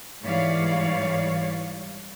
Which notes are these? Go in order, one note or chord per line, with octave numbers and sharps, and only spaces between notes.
G#2 E3 G3 C#5 D5 F5